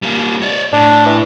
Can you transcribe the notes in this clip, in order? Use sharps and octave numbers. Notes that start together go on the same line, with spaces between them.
G3 A#3
C#5 D5
A2 D4
E3